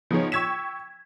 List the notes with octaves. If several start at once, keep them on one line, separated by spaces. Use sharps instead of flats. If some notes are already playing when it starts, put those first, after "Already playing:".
F3 B3 D#4 G#4 C#5
G5 C#6 E6 G#6 B6 E7